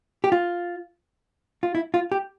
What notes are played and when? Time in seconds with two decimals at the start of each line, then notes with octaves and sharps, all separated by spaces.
0.24 G4
0.32 F4
1.63 F4
1.75 E4
1.94 F4
2.12 G4